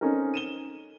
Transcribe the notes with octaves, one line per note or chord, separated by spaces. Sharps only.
C4 C#4 D#4 A4 A#4
D#7 E7 G7